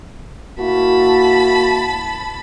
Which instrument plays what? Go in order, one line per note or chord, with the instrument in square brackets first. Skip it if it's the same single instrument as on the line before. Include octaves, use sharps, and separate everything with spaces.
[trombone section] A#3 E4 F#4 [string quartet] A5 B5